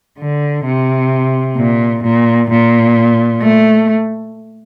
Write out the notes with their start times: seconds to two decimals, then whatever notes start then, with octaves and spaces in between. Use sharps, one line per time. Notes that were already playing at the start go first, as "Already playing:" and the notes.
0.19 D3
0.65 C3
1.57 A#2
2.04 A#2
2.50 A#2
3.42 A3